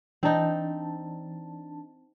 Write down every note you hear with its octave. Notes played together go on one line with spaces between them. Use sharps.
E3 C4 D4 D#4 A5